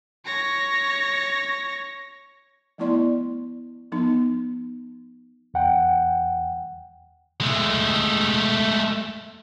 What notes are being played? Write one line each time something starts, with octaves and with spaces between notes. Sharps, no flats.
C#5 A#6
F3 A3 B3 E4 D5 C6
F3 B3 D#4
E2 F#5 G5
G#3 A3